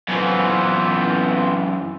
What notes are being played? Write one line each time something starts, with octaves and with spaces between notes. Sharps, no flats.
F#2 E3 B3 C4 F4